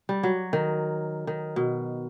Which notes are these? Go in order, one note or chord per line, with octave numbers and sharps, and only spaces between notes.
G3
F#3
D#3
D#3
B2